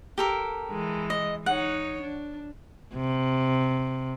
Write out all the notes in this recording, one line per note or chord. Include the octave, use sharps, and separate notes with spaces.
G4 A4 A#4
E3 G#3
D#5
D#4 C#5 F#5
D4
C3